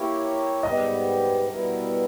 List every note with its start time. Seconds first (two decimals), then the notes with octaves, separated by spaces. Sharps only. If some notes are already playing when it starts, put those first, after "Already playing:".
Already playing: A#3 E4 G4 A#4 C#5
0.63 G#2 G3 B3 G4 D#5
1.49 B2 G3 B3 E4 A#4